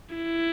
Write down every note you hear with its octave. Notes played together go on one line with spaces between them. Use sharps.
E4